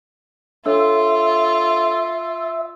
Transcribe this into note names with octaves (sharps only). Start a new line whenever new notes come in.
D4 F4 A4 C#5 E5